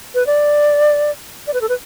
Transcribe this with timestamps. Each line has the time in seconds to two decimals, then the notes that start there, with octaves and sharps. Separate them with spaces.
0.15 B4
0.27 D5
1.47 D5
1.54 B4
1.61 A4
1.69 B4